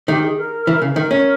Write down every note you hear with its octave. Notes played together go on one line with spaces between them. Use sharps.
D#3 G4
G#4
A#4
E3
C#3
D#3 A#4
C#4